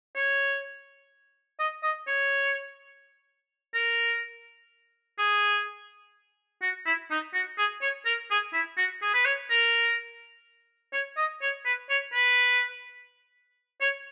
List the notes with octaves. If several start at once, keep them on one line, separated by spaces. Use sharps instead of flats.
C#5
D#5
D#5
C#5
A#4
G#4
F#4
E4
D#4
F#4
G#4
C#5
A#4
G#4
E4
F#4
G#4
B4
C#5
A#4
C#5
D#5
C#5
B4
C#5
B4
C#5